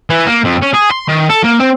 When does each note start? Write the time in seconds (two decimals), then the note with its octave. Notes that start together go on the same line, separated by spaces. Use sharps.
0.10 E3
0.27 A#3
0.45 F2
0.63 C#4
0.74 G#4
0.91 C6
1.08 D#3
1.30 A4
1.44 A#3
1.60 C4